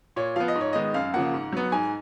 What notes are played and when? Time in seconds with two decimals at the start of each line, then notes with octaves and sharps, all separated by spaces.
0.16 A#2 C#5
0.36 F3 B3 F5
0.48 D#5
0.55 G#2
0.61 C#5
0.73 D#3 G#3 B3 D#5
0.94 F#2 F5
1.14 C#3 F3 A#3 F#5
1.34 G#2
1.53 F#3 B3
1.72 G#2 G#5